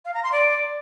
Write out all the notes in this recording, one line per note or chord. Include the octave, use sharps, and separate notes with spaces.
F5
A#5
C6
D5